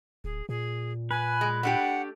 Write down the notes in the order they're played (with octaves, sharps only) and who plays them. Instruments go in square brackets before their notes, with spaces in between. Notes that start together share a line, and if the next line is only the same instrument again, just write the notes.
[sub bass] D1 [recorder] G#4
[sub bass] A#2 [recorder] G#4
[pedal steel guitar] B4 [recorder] G#5
[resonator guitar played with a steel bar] G#3
[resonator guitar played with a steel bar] A3 D4 G4 [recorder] F#5